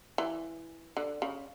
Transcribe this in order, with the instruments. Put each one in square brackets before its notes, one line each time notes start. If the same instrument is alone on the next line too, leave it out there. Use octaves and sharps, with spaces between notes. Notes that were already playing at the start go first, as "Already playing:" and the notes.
[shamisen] E3
D3
C#3